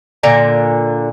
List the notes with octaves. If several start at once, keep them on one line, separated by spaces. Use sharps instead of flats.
A#2 D3 A#5